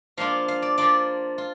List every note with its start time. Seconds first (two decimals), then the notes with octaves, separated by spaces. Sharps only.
0.17 F3 A#3 D4 F4 F5
0.48 F5
0.62 D5
0.78 F3 A#3 D4 F4 D5
1.38 F4